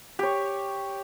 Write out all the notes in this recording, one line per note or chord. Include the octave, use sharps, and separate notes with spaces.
G4 C#5